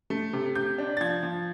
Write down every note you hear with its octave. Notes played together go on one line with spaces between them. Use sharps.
A3
C3
C3 G6
D4
A6
F3 G#6
F3